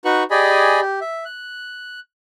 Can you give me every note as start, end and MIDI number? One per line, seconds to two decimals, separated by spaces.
0.05 0.24 63
0.05 0.24 66
0.05 0.24 71
0.05 0.24 85
0.05 0.24 90
0.31 0.80 67
0.31 0.80 68
0.31 0.80 74
0.31 0.80 75
0.31 0.80 80
0.31 0.80 83
0.81 1.00 67
1.01 1.24 76
1.25 2.00 90